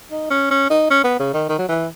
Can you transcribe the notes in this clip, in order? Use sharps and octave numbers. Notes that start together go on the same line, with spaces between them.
D#4
C#4
C#4
D#4
C#4
B3
C#3
D#3
D#3
F#3
E3